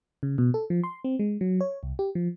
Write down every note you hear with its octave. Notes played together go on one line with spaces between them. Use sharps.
C#3
B2
A4
F3
C6
C4
G#3
F#3
C#5
C2
G4
F3